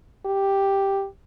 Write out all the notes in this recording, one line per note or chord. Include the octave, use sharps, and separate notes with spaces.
G4